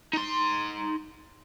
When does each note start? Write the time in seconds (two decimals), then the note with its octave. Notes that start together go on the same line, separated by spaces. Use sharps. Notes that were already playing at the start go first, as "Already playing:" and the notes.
0.13 D#4 C6